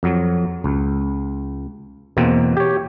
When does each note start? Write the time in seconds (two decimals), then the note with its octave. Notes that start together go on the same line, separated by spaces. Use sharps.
0.03 F2 F#3
0.64 C#2
2.17 E2 B2 A#3 C4
2.57 G4 C#5